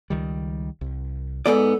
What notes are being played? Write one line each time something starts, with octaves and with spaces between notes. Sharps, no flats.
C#2 D#3 G3
C2
G#2 B3 A4 D5